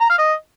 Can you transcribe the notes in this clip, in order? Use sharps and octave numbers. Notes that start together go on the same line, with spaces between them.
A#5
F5
D#5